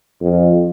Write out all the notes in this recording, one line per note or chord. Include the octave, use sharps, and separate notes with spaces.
F2